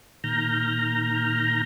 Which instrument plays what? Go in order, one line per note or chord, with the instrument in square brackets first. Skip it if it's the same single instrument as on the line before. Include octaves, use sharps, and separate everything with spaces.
[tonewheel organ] A#2 D#3 A#5 F6 G6 A#6